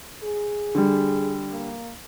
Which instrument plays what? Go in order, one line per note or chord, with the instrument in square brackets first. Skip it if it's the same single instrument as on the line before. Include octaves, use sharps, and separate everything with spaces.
[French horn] G#4
[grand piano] D3 G3
[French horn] A#3